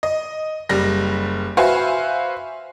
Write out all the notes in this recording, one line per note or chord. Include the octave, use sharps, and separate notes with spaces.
D#5
F#1 G3 A#6
F#4 B4 C5 E5 F5 G#5